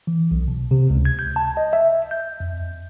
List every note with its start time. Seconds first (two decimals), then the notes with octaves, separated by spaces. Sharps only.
0.07 E3
0.31 B1
0.48 B2
0.71 C3
0.90 C#2
1.05 G#6
1.19 G6
1.36 A5
1.57 D#5
1.73 E5
2.11 G6
2.40 F2